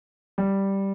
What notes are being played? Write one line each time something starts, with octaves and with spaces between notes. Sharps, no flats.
G3